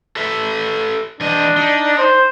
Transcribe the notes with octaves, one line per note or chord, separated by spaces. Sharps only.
A4 B4 E5
E3 G3 D4 D#5
D#4
C5